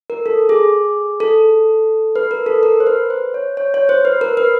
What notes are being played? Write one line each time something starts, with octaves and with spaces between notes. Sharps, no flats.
A#4
A4
G#4
A4
B4
A#4
A4
A#4
C5
B4
C5
C#5
C#5
C#5
C5
B4
A#4
B4